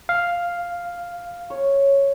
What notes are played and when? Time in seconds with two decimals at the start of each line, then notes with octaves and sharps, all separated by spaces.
0.09 F5
1.50 C#5